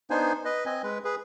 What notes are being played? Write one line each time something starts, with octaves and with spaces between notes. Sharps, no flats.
B3 D4 D#4 C5 G#5
B4 D#5
C4 D#5 G#5
G#3 B4
G#4 B4